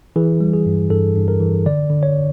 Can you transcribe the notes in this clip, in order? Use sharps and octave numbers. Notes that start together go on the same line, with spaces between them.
E3 G#4
G3
G#4
G2
G2 A4
G2
A#4
E3
D3 D5
D3
C#5